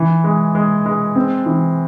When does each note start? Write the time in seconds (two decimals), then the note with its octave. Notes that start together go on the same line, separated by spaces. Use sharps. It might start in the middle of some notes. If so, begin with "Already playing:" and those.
Already playing: E3
0.24 G#3
0.55 G#3
0.86 G#3
1.15 C4
1.46 E3